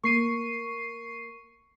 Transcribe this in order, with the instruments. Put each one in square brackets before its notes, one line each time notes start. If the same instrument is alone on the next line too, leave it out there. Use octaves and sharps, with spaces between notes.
[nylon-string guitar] A#3 [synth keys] C#6 C7 D#7